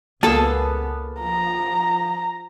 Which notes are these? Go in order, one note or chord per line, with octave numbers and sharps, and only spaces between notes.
C#2 A#3 B3 G#4 A4 A5
F3 A#5